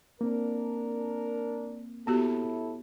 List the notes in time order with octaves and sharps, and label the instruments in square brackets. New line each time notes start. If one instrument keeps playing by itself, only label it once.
[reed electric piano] A#3 C4 [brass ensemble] D4 A#4
[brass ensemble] A2 E4 A4 [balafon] B3 F#4 G4